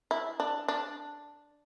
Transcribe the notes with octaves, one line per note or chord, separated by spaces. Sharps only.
E4
D4
D4